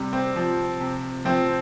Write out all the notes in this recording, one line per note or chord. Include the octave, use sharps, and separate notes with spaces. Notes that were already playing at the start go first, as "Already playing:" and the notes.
Already playing: C3 G3
C4
F3
C3
F3 C4